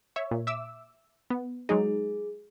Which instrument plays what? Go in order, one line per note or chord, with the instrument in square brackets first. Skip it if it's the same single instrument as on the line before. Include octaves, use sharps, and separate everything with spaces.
[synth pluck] C#5 E5
A#2
E5 D6 E6
B3
[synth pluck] F#3 G#3 D#4 [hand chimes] G#4